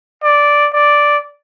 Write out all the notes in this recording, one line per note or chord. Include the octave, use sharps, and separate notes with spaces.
D5
D5